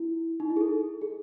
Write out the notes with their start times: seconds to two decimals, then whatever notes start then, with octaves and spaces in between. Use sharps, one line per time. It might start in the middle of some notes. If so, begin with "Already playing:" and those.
Already playing: E4
0.40 D#4
0.50 E4
0.56 G#4
0.61 A4
1.01 G#4